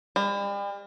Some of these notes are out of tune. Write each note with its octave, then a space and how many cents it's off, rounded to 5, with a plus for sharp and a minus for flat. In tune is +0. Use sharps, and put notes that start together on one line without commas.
G3 +40